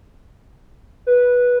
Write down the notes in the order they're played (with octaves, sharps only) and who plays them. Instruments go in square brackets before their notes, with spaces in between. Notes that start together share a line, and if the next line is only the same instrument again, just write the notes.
[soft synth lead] B4